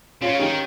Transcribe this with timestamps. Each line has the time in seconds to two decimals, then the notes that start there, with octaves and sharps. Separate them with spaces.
0.21 C#3 C#4 F4
0.39 D#3 D#4 G4